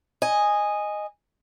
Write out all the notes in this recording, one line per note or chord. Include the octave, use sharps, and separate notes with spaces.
D#5 G#5